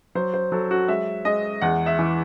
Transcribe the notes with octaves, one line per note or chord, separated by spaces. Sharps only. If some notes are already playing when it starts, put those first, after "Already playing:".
F#3 C5
C5
F#3 A4
F#4
G#3 E5
G#3 D#5
E2 F#5
E5
E3